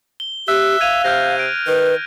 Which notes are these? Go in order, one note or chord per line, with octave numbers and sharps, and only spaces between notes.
G7
G4 E5 F#6
F5 G#6 D#7 F7
C3 F6 G6 A#6
D7
D#3 B4